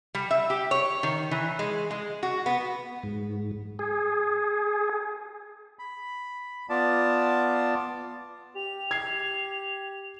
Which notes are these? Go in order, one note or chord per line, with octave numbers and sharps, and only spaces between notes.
G3
E5
G4
C#5
D#3
E3
G#3
G#3
F#4
B3
G#2
G#4
B5
B3 F4 D5 A5
G4 F7
G#6 C7